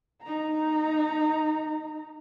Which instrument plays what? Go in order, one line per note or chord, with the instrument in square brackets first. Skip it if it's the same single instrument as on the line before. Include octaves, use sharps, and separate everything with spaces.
[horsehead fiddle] D#4 A#5